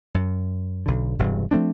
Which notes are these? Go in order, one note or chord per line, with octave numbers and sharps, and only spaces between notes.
F#2
B1 D3
E1 G2 C3
F3 A3 C4 D4